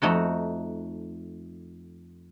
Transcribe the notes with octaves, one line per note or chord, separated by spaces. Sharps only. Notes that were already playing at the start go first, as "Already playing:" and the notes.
F2 A3 D#4 F#4